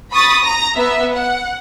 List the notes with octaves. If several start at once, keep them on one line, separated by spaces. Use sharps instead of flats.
B5 C#6 D#6 A6
A#5 A#6
B3 E5
F#5